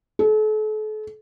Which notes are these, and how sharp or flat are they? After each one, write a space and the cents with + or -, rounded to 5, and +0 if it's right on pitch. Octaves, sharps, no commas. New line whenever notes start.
A4 -40